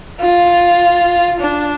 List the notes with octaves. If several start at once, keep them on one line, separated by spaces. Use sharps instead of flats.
F4
D4